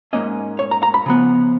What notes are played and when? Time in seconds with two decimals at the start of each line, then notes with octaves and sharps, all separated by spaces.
0.13 G#2 D#3 A#3 C#4 D#5
0.59 C#5
0.71 A#5
0.83 A#5
0.94 B5
1.06 C#3 F3 B3